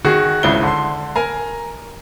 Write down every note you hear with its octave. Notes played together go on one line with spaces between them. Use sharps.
D#3 F#4 G#4
G#1 C#2 E4 G7
D3 C6
A#4 G#5 A#5